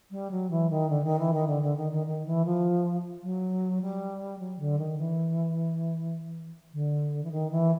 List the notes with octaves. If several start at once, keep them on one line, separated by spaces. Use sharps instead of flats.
G3
F#3
E3
D#3
D3
D#3
E3
D#3
D3
D3
D#3
D#3
D#3
E3
F3
F#3
G3
F#3
D3
D#3
E3
D3
E3
D#3
E3